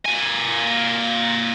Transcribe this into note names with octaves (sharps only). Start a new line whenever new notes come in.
A#3 G#5